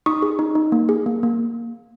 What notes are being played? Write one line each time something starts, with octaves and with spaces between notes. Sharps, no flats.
D#4 C#6 D#6
G#4
D#4
D#4
A#3
G#4
A#3
A#3